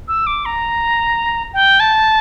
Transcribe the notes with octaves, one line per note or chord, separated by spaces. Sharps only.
E6
D6
A#5
G5
A5